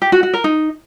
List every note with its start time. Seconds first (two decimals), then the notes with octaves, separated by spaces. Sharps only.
0.02 G4
0.12 F#4
0.23 F#4
0.34 A#4
0.44 D#4